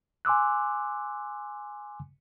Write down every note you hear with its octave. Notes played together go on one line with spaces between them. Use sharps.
G#5 C6 D6 E6 F#6